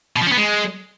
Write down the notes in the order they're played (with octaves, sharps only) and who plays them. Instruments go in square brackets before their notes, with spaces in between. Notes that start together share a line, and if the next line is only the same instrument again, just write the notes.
[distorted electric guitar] B2
F3
C#4
B3
G#3